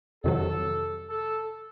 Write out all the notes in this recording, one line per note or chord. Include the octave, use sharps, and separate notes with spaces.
F2 C3 D#3 F#3 A4
A4